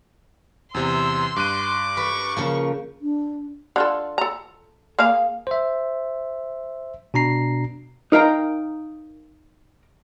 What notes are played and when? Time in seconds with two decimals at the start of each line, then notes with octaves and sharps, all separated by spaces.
0.74 E2 C3 C6 E6
1.36 G2 D6 F#6 D#7
1.97 B4 C#6
2.37 C#3 F3 A#3
3.01 D4
3.76 D3 F4 A4
4.18 A4 A#5
4.99 A#3 G#4 F5
5.47 C5 E5
7.14 B2 D4 A#5 C7
8.12 D#4 A#4 F5 G5 A#5